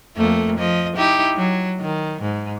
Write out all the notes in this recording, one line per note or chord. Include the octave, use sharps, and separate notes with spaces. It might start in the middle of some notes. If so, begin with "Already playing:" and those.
F2 A3 A#3
F3 D#5
D#4 E4 G4
F#3
D#3
G#2